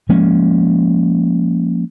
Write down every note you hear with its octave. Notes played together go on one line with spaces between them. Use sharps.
F3 G#3 A#3 C#4